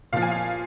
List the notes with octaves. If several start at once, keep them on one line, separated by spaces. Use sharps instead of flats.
A#2 F3 F5
G#5
F5